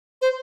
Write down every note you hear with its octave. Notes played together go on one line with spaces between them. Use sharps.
C5